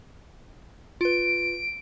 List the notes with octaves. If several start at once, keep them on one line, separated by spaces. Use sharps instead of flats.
F4 B4 D7